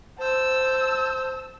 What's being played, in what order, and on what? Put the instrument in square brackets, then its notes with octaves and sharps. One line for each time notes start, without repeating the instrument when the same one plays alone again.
[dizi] C5 [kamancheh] A5 E6